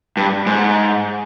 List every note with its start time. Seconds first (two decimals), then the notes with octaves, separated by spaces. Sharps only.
0.17 G2
0.46 G#2